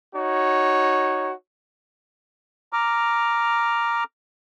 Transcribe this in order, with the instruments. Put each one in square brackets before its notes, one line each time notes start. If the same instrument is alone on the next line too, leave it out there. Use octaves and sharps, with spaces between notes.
[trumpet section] D#4 F#4 C#5
[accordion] A#5 D6 F6